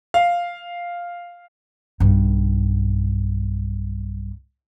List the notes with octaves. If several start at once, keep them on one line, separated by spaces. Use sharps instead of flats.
F5
B1 G2